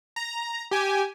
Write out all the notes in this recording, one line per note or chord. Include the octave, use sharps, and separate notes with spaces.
A#5
G4 G#5